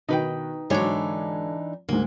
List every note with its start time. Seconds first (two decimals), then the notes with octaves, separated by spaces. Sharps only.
0.09 B2 D#3 D#4 B4 G5
0.70 G#2 D3 E3 F#3 D4 D#4 C#5
1.89 D2 G#2 A#3